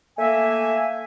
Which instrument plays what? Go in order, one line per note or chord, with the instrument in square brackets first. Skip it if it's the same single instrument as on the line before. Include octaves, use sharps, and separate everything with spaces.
[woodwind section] A3 A#3 E5 G#5